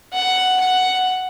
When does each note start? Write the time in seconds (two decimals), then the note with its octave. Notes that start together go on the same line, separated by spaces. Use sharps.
0.13 F#5
0.61 F#5